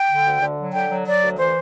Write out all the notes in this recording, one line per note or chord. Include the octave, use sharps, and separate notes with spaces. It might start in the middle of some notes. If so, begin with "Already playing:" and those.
Already playing: G5
D3
D2
D3
F#3
D3 G5
F#3
F#3 D5
D2
E3 C5